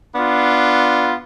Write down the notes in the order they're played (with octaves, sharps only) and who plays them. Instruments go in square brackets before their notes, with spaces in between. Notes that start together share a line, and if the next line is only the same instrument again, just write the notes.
[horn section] B3 D4 F4